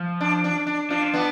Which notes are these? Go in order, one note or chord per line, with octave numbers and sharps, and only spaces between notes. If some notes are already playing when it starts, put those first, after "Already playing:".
Already playing: F3
D4
D4
D4
F3 D4
B3 D4